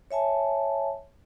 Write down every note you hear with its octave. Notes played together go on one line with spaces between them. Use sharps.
C#5 E5 G#5 A5